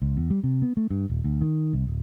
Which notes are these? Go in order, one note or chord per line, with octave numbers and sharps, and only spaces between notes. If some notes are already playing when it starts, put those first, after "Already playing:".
C#2
E2
G3
C3
B3
A3
G2
D#1
D2
D#3
C2
D1